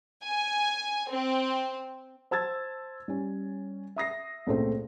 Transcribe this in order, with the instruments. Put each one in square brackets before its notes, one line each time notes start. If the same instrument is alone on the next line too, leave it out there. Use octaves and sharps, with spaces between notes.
[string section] G#5
C4
[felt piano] C5 A5 E6 G#6 A6
G3 C#4
E5 D#6 A#6 C7
C#2 A#2 A3 C4 C5